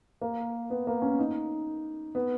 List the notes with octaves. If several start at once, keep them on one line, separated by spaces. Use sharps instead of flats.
A#3
B3
A#3
C#4
D#4
B3